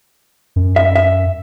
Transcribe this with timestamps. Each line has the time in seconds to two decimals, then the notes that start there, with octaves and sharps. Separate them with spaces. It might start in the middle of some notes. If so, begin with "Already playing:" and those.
0.56 F#2
0.76 E5
0.96 E5